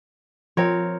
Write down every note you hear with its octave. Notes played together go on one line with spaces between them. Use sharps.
F3 C4 A#4 C#5